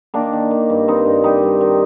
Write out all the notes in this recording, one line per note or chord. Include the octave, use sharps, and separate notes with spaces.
D#3 A#3 D4
D#3
D#3
G2
G3 C4 D#4
G2
G3 D#4 G4
G3
D#3